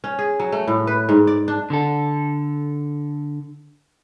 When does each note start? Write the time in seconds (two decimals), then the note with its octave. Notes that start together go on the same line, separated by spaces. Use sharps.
0.04 C#4
0.19 G#4
0.40 F#3
0.52 A3
0.67 A2
0.87 B4
1.09 G#2
1.27 D5
1.48 D4
1.70 D3 A4